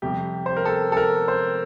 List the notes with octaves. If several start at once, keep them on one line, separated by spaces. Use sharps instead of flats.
F2 C3 G3 G4
C5
A#4
A4
A4
A#4
C5